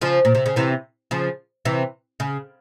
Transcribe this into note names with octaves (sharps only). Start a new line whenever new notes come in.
C#3 F3
A#2
C3
C#3
C3 E3
C#3 F3
C3 E3
C#3